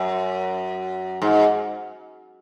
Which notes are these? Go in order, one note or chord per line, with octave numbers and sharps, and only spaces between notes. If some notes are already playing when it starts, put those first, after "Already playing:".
Already playing: F#2
G#2